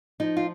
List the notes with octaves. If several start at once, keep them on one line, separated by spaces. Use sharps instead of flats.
F3 D#4
F4